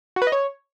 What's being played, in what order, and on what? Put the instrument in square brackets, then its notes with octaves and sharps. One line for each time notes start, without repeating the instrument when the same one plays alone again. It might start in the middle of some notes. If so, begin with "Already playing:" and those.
[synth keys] F#4
B4
D#5
C#5